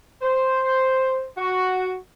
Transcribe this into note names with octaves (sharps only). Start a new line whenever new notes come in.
C5
F#4